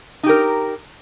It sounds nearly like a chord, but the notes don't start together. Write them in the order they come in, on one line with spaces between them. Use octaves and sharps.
D#4 G4 A#4